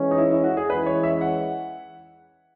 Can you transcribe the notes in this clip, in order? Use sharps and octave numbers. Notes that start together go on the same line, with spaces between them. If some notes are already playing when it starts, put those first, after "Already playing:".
Already playing: E3 G#3 C#4
D#4
E4
E4
F#4
G#4
E3 G#3 C#4 E4 B4
C#5
E5
F#5